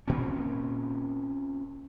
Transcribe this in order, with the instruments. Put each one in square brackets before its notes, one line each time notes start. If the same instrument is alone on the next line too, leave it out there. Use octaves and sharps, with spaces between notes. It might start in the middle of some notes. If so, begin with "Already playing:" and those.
[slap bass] A#2 C4 C#4